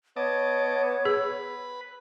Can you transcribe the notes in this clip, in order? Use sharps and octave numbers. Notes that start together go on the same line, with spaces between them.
B3 C#5 D#5 A5 D6
G#4 B4 B5